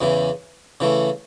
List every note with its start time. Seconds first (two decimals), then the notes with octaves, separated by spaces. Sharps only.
0.01 E2 C#3 E3
0.80 C#3 E3 A3